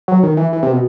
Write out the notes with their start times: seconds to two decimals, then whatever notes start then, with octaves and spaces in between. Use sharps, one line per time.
0.08 F#3
0.23 D#3
0.37 E3
0.53 E3
0.63 C3
0.72 B2